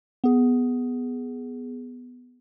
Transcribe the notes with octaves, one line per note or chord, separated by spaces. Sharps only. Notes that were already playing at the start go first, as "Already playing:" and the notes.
B3 G#4